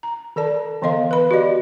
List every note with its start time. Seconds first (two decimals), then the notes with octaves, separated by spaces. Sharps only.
0.03 A#5
0.36 D#3 A4 D5 A5
0.82 D3 E3 B3 D#5 F5 C6
1.11 B4 B5
1.31 F#4 G4 D5 D#5